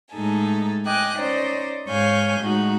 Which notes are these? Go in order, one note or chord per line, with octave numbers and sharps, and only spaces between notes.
A2 G#3 D#4 A4 G#5
D#5 G5 G#5 D6 F#6
C#4 D#4 C5 D5 D#5
G#2 C#5 F5 G#5 G6
A2 G#3 D#4 F#4